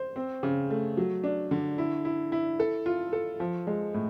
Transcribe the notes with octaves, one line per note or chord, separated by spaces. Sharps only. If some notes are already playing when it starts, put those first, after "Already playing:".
Already playing: C5
C4
C#3
A3
F#3
D4
D3
E4
E4
E4
A4
F4
A4
F3
G#3
A2